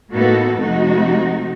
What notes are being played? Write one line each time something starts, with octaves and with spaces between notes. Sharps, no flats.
A2 A#3 B3 D#4 F#4 A4
F2 C3 A3 D#4 F#4